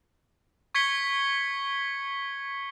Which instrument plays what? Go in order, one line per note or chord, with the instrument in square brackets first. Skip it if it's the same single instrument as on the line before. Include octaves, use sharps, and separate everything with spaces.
[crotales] C#6 G#6 B6 C#7 G7